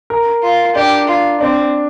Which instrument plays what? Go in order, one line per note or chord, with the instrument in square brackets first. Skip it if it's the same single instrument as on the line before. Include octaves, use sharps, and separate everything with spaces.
[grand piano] A#4
[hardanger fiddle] F4
[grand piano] D4 [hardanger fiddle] G4
[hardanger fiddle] F4
[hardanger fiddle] C4 [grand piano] D4